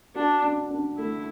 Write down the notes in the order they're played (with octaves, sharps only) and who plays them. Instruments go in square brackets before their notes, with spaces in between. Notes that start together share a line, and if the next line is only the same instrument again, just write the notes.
[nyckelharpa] D4 [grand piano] F#4
[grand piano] D4
D4
[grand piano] A3 [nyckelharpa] E4